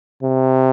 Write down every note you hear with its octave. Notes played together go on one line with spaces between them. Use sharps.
C3